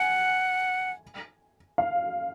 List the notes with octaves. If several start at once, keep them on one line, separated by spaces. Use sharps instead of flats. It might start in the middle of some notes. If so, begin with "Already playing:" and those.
Already playing: F#5 G#5
F5